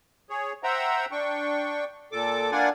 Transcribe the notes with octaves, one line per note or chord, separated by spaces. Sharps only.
G#4 C#5
C5 E5 F#5 G5 A#5
D4 G5 C#6
A#2 A4 D6
A#3 D4 F4 D5 F#5 G#5